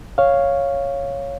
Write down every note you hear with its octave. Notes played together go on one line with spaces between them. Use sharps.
C#5 F5